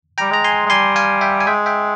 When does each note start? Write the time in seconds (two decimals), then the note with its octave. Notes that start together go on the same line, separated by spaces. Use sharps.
0.18 G3 G5 A#5
0.31 G#3 A#5
0.44 G#5 C6
0.66 G#3
0.70 G3 G#5 C6
0.96 F5 G#5
1.21 E5 G5
1.41 G#5
1.47 G#3 E5 G5
1.66 E5 G5